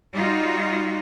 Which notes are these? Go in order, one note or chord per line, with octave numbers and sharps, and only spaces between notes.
G3 D#4 F4 F#4